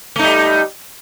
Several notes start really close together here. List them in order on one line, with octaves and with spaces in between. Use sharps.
A3 D#4 G3